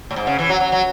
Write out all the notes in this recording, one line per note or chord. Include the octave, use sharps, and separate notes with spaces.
A2
G#2
C#3
E3
F#3
F#3
F#3